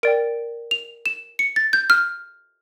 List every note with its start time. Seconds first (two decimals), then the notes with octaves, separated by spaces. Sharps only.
0.03 A#4 D5 G5 D7
0.71 F7
1.06 E7
1.39 C#7
1.56 A6
1.73 G6
1.90 F6